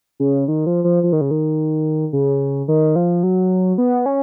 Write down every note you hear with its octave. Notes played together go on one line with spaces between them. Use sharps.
C#3
D#3
F3
F3
F3
D#3
C#3
D#3
C#3
D#3
F3
F#3
B3
C#4